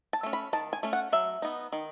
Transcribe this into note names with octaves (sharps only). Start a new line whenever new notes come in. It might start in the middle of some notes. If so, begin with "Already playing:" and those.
A5
A3 C#4
B5
D#3 A5
G#5
A3 C#4
F#5
F#3 E5
B3 D#4
D#3